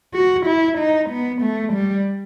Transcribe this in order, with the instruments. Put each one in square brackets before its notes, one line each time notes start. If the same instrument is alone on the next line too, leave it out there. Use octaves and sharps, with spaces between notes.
[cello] F#4
E4
D#4
B3
A3
G3